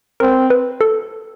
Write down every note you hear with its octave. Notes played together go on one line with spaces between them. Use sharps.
C4 A#4
B4
A4